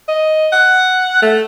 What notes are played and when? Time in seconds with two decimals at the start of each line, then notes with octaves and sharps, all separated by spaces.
0.08 D#5
0.52 F#5
1.22 A3